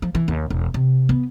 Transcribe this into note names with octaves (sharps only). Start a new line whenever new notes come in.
F3
E3
D#2
E1
C3
B3